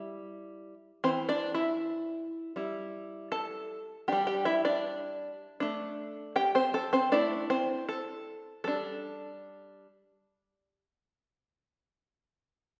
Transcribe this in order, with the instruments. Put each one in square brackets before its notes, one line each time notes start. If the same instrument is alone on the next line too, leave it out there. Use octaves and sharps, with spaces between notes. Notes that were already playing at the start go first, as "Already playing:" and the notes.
Already playing: [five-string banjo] G3 E4
E3 C4 C5
D4 D5
E4 E5
G3 E4
A4 A5
G3 D4 G4 G5
G4 G5
E4 E5
D4 D5
A3 D4
G4 G5
C4 C5
A4
C4 C5
A3 D4 E4 D5
C4 C5
A4
G3 D4 A4